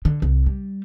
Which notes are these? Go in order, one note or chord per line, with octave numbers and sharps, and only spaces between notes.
D3
C2
G3